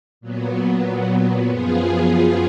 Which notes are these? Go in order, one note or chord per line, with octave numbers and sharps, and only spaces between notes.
A#2 F#3 B3
F#2 F3 B3 F4 G#4